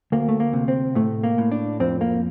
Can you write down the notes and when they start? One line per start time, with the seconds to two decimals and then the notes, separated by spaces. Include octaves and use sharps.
0.12 D2 A#3
0.28 A3
0.40 A#3
0.53 C3
0.68 C4
0.95 A2 A3
1.23 A#3
1.38 A2
1.52 D4
1.80 F2 C4
2.01 A#3